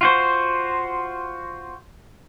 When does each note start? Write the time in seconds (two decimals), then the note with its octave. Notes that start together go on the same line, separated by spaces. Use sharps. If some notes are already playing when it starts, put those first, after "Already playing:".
0.01 F4 F#4 C5